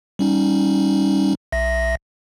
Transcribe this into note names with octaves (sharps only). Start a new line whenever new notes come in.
G3 C#4 D#4
B1 E5 A#6